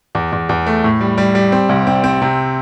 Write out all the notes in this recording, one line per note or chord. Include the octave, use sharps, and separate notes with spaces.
E2
E2
E2
A3
A2
G3
G3
G3
C4
C2
C4
C4
C3